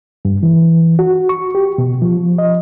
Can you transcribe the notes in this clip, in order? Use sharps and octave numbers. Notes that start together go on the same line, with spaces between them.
G2
E3
F#4
C#6
G4
B2
F3
D#5